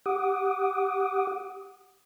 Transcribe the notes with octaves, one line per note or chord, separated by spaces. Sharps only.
G4 F#5 D6 D#6